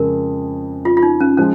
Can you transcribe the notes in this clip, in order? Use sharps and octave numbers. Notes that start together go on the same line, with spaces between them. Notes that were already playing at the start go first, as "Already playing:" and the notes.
Already playing: F2 C#3 G#3 A#4
F4
F4
D#4
C#4
F3 G#3 C#4